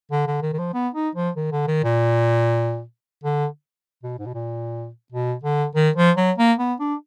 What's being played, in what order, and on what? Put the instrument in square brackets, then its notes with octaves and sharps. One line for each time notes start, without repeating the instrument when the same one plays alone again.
[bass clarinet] D3
D3
D#3
D#3
F3
B3
D#4
F3
D#3
D3
D#3
A#2
D3
B2
G#2
B2
A#2
B2
D3
D#3
F3
F#3
A#3
B3
D4